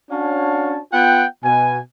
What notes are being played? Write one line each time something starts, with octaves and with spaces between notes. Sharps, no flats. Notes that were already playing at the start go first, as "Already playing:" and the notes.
C#4 D4 F#4 C#5 F5 A5
B3 F4 F#5 G5
B2 G#5